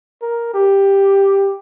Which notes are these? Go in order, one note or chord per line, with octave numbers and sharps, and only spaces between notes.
A#4
G4